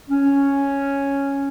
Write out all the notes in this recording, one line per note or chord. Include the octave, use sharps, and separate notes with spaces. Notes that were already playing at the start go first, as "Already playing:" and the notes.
C#4